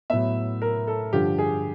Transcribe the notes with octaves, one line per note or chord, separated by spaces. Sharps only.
A2 F#3 B3 E5
A#4
A4
G2 D3 F3 G4
G#4